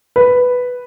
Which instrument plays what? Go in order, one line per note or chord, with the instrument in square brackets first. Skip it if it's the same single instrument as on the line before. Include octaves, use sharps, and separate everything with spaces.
[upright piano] B4